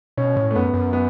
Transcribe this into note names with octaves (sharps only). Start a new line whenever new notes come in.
B2 C#4
A2
A3
F#2 B3
F#2
B3